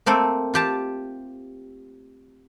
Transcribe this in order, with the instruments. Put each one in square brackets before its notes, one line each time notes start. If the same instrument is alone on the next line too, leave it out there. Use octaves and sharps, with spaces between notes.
[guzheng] A3 A#3 C4 A4
F4 G4 A5